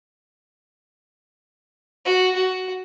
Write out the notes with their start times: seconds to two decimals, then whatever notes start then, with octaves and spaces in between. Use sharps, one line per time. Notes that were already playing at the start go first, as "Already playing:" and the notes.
2.05 F#4
2.35 F#4